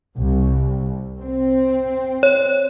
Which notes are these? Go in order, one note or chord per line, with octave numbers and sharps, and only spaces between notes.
C2
C4
C#5